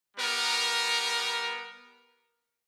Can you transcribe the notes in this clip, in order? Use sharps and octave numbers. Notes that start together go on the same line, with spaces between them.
G3 B3 A#4